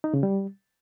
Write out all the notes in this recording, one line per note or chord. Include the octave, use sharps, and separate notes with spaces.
D#4
C#3
G3